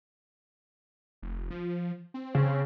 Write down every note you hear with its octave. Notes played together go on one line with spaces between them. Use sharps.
F1
F3
C4
C#3